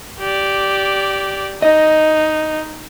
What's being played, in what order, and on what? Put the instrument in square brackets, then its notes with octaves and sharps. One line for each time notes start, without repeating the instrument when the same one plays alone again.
[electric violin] G4 D5
[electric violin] D#4 [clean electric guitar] D#5